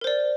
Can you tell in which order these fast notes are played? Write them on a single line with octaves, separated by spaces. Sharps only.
A#4 C5 D5